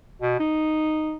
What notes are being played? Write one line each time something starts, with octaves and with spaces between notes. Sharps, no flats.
B2
D#4